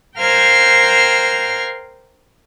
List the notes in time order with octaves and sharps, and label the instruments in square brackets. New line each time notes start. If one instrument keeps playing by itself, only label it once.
[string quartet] A#4 C5 F5 G5 F6 G#6